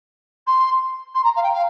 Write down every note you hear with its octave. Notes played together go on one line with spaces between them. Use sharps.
C6
C6
A#5
F5
G5
F5